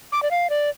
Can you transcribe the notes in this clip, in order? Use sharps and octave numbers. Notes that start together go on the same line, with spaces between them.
D6
D5
F5
D5